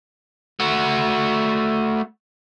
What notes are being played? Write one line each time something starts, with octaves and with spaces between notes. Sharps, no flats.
A3 F#4